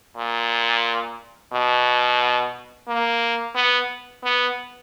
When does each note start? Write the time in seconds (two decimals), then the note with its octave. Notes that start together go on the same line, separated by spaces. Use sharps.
0.17 A#2
1.53 B2
2.88 A#3
3.56 B3
4.24 B3